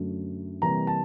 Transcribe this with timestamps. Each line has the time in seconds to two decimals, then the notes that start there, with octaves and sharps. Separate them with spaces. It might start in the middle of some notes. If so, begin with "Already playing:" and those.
Already playing: F#2 D3 F#3 A3
0.62 C3 E3 G3 A#3 A#5
0.87 A5